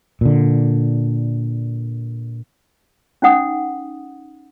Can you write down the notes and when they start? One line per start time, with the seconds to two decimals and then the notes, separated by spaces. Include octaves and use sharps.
0.21 A#2 D3
3.22 C#4 D#4 F#5 D#6